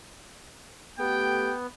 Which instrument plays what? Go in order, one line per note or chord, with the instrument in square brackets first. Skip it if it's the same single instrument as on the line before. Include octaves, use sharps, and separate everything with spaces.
[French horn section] A3 G4 [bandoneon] B3 [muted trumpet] G5